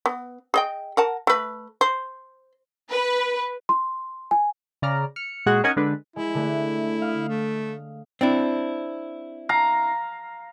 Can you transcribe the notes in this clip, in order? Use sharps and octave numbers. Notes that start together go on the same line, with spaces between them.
B3
G#4 D#5 G5
A#4 F#5 A5
A3 B4
C5
B4
C6
G#5
C#3 D5 A#5 F6
F6 C#7
A#2 G#3 F#4 G#4 F#5 F#6
C#4 D#4 A#4 F#5 G#5
D3 G#3 D4 B4
G#3 E4
D3 A3
F5 D#6
A3
C4 D4 E4
F5 A#5